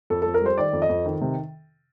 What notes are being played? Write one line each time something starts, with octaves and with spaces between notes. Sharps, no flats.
F2 A4
F2 A4
A#4
G3 C5
D#3 D5
F2
D#5
F2
D#3
C3